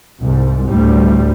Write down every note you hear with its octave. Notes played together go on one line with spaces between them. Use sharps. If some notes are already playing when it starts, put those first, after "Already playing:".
C2 G#2
D2 A2 G3